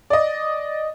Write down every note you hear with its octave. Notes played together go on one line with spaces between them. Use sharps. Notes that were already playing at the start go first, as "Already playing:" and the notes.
D5 D#5